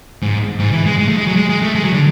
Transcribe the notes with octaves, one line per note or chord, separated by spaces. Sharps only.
G#2
G#2
E3
G#3
G#3
A3
G#3
F#3
G#3
G#3
A3
G#3
F#3
D3